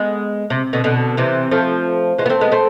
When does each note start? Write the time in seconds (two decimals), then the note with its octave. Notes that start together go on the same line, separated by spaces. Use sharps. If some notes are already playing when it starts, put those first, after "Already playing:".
Already playing: G#3 B3
0.50 C3
0.73 B2 D3
0.84 B2 D3
1.17 C3 E3
1.51 F3 A3
2.19 E3 G#3
2.26 B3
2.30 A3 C4
2.41 G#3 B3
2.52 A3 C4